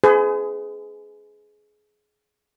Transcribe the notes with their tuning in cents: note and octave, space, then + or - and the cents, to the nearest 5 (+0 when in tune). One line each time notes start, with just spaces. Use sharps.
G#4 +20 C5 -45